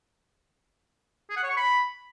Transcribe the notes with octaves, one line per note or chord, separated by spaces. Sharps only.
G#4
F#5
C#5
C#6
B5